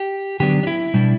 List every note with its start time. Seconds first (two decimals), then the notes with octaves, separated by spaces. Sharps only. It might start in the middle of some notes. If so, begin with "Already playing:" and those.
Already playing: G4
0.40 D3 F#3 B3 D4 G4
0.63 D4
0.67 E4
0.94 B2 G3 D4